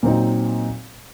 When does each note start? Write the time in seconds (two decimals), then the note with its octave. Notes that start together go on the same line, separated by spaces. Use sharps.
0.03 A#2 F#3 C4 D#4